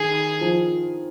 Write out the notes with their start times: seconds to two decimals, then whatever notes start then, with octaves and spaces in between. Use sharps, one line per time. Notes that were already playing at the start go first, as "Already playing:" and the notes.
Already playing: D#3 G#4
0.41 F3